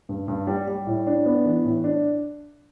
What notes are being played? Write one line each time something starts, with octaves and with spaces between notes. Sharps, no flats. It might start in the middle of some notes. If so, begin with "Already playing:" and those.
G2
G2
G3
G3
A2
D4
B3
E3
A2
D4